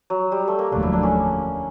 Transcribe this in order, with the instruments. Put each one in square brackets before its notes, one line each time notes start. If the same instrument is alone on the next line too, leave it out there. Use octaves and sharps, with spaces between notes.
[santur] F#3
G3
A3
A#3
[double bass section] F1 D#2 D3 F#3 A3 [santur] D4
[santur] E4
D4
C#4